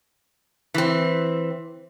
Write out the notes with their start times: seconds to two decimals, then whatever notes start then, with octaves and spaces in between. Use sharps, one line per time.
0.74 E3 C4